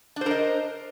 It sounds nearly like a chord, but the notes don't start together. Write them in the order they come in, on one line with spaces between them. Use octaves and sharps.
D4 C5 A#4 D#5